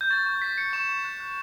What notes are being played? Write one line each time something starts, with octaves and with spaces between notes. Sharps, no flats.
G6
C#6 A6
C#6
G6 B6
G6 C#7
C#6 E7
C#6
F#6
F#6